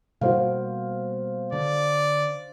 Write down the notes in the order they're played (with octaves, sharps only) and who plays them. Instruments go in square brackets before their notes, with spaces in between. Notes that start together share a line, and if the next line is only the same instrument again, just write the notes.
[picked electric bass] B2 G3 A#3 [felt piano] F#4 C5 F5
[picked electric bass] D3 [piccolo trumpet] D5